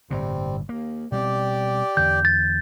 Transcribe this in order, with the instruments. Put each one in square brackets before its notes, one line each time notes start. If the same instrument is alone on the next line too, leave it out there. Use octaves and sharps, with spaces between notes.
[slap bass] G1 A2 C3 [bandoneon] G3 C4
[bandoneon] D#2 [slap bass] A#3
[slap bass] B2 G3 C4 [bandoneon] G4 D5 G5
[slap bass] E2 D3 [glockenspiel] G6
[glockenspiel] A6